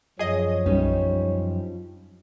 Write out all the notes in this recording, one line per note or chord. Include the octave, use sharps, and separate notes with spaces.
F#2 F3 G#4 C#5 D#5
B1 G3 C#4 D#4